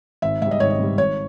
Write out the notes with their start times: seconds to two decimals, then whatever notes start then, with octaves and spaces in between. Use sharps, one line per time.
0.22 G#1 E5
0.42 G#2 G3 E5
0.51 D#5
0.60 G#1 C#5
0.70 D#5
0.80 G#2 G3
0.98 G#1 C#5